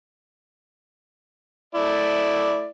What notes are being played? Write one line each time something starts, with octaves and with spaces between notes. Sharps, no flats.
A3 E4 D5